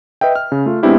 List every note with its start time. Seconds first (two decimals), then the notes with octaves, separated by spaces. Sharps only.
0.21 B4 D#5 E5 G5
0.36 F6
0.52 C#3
0.66 A3 F4
0.83 G#3 B3 C4 D4 E4 G4